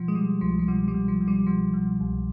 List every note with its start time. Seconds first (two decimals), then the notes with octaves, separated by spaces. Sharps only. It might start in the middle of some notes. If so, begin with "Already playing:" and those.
Already playing: B2 F3
0.08 G#3
0.15 B2 G3
0.41 C2 F3
0.59 F3
0.68 B2 G3
0.88 G3
0.94 B2
1.08 F3
1.21 B2
1.28 G3
1.46 B2 F3
1.73 B2
2.00 C2